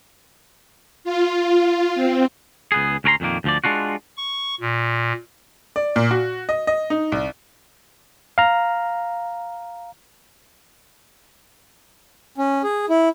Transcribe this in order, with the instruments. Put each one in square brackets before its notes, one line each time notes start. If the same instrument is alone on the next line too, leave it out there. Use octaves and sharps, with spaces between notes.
[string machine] F4
C4
[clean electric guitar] C#2 B3 G#4
D2 C#4 G4 A#5 C6
F2 A#2 D#3 A#3
D2 F3 D5
G#3 D4 F4 F#4
[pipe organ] C#6
A#2
[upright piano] D5
A#2
F#4
D#5
D#5
D#4
C2
[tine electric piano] F5 A#5
[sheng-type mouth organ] C#4
G#4
E4